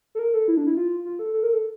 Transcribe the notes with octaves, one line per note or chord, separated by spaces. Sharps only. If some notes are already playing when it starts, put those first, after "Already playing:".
A4
A#4
A4
E4
D4
E4
F4
F4
A4
A4
A#4
A4